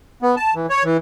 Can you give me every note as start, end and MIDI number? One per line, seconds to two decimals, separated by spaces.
0.22 0.35 59
0.37 0.54 81
0.55 0.66 52
0.70 0.83 73
0.84 0.97 52